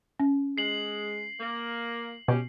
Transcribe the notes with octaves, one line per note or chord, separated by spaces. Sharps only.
C#4
G#3 C7 F#7
A#3
B2 C#4 G4